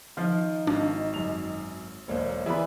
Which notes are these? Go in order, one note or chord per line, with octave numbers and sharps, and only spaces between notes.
D#3 F3 F4
G#1 D4
F#2 F7
E1 B1 A#3 C5 C#5
E3 B3 G#4 D5 E5 B5